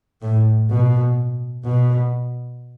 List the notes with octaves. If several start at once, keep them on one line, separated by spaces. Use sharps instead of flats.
A2
B2
B2